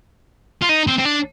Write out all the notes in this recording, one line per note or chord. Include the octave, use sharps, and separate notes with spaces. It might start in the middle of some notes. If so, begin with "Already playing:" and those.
F4
D#4
C4
C4
D4